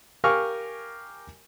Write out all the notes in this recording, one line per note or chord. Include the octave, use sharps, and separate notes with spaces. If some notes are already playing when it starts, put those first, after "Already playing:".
G4 A#4 F5 G#5 C#6 F6